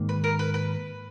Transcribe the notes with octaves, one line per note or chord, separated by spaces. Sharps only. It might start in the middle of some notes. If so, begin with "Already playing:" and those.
Already playing: G#2 D#3 A#3
B4
A#4
B4
B4